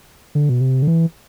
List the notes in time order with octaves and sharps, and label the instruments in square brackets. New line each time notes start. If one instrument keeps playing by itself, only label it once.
[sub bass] D3
B2
C3
D3
E3